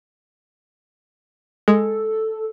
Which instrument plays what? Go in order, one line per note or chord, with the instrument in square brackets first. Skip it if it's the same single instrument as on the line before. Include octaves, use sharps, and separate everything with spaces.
[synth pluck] G#3 [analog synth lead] A4